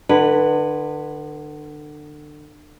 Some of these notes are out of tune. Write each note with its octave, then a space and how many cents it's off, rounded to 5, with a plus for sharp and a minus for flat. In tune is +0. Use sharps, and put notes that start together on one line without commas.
D3 +30 B4 +0